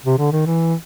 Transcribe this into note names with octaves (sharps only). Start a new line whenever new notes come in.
C3
D3
D#3
E3